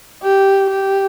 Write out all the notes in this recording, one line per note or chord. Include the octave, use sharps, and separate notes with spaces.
G4
G4